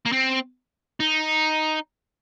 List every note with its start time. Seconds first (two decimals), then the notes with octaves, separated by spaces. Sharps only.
0.06 A#3
0.12 C4
1.00 D#4